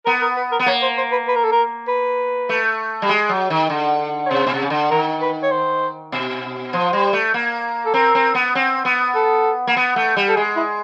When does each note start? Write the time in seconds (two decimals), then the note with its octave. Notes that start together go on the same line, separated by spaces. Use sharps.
0.06 B3 A#4
0.22 A#4
0.37 B4
0.52 A#4
0.59 B3
0.66 A#3 C#5
0.82 C5
0.98 C5
1.12 B4
1.28 B4
1.36 A#4
1.44 A4
1.52 A#4
1.88 B4
2.49 A3
3.02 G3
3.09 G#3
3.29 F#3
3.50 D#3
3.70 D3
4.26 C#5
4.30 C3 C5
4.47 B2
4.54 C3
4.62 C#3
4.70 D3
4.91 D#3 A#4
5.21 B4
5.43 C#5
5.51 C5
6.12 B2
6.73 F3 C5
6.93 G3
7.13 A3
7.34 A#3
7.85 A4
7.94 C4 A#4
8.15 C4
8.35 B3
8.55 C4
8.85 B3
9.15 A4
9.67 A#3
9.77 B3
9.96 A3
10.16 G3
10.29 A4
10.36 G#3 G#4
10.56 E4